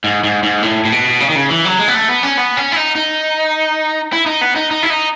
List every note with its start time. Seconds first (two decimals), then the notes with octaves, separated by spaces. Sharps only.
0.04 G#2
0.24 G#2
0.43 G#2
0.63 A2
0.85 A2
0.92 B2
1.20 C#3
1.30 D#3
1.35 C#3
1.50 E3
1.65 F#3
1.79 G#3
1.88 B3
1.94 A3
2.09 B3
2.23 C#4
2.37 B3
2.57 C#4
2.72 E4
2.76 D#4
2.95 D#4
4.13 E4
4.26 D#4
4.41 B3
4.56 D#4
4.71 D#4
4.83 E4
4.90 D#4